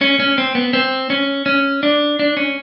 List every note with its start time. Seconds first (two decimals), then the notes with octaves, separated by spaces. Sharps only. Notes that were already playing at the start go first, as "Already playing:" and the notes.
0.01 C#4
0.20 C#4
0.38 C4
0.55 B3
0.73 C4
1.10 C#4
1.46 C#4
1.83 D4
2.19 D4
2.37 C#4